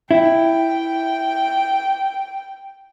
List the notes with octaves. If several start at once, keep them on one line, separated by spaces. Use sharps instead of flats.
E4 G5